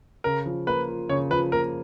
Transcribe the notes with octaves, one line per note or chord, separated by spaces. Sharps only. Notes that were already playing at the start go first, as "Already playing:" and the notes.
C#3 A#4
F3
A#3 B4
F4
C#3 C#5
F3 B4
A#3 A#4